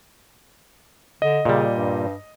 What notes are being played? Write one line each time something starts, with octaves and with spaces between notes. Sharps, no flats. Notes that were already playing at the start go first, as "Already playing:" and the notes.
D3 D#5
A#2 C#3 G3
G2